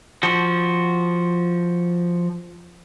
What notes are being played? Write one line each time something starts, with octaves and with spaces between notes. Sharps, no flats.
F3 F#4